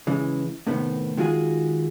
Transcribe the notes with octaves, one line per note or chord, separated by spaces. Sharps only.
C#3 E3 G#3
A2 C3 D#3 B3
D#3 G#3 F4 F#4 G#4